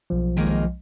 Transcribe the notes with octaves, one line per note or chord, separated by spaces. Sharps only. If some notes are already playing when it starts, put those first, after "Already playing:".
B1 F3
D#3 G#3 A#3